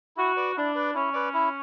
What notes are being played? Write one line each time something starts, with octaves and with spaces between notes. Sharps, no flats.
E4 F#4
B4 D5
D4 E4
B4 D5
C#4 E4
B4 D5
E4